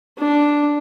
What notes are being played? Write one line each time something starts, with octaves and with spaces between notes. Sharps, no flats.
D4